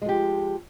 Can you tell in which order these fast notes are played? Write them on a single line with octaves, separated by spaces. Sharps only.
G#3 F3 G4